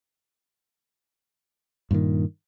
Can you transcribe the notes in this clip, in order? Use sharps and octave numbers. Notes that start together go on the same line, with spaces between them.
G2 A#2 D3 D#3